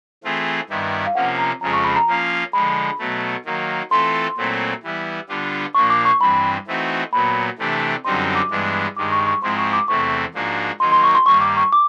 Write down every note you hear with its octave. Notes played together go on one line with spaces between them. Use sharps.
E3 A3 C4 F4 G#4
G2 D#3 G3 B3 E4
F5
C3 F3 A#3 C#4 F#5
A#5
F2 C#3 F3 G#3 A#5
C#6
B5
A#5
F3 A#3 C#4 F4
D3 F3 G#3 B5
B2 F#3 A3
D#3 F#3 A#3
E3 A3 C4 F4 A4 C6
A#2 F#3 A3 C4 E4
E3 G3 B3 E4
D3 G3 B3 D4 F4
A#2 F3 A#3 D4 C#6
D6
C#6
G2 E3 G3 C4 B5
E3 A3 C4 D#4 F#4
A#2 F#3 B3 B5
C3 E3 A3 D4 G4
F#2 D3 G3 C4 D#4 C6
D6
G2 E3 G#3 B3 D4
G2 D#3 G#3 D6
C#6
C#6
G#2 F3 G#3 C4 E4 C6
C#6
D6
E2 C3 E3 A3 C4 C#6
G#2 F3 A#3 D4 F#4
D#3 F#3 A#3 D#4 C6
C6
C#6
C6
G2 D#3 G3 A#3 C#6
D6
C#6
D6